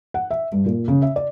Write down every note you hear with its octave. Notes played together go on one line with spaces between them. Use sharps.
F#5
E5
G2
A#2
C#3
E5
D5